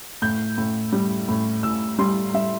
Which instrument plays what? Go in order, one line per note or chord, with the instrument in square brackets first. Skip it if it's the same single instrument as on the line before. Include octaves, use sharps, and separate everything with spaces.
[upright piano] A2 G6
A2
G3
A2
A2 E6
G3 C6
G3 E5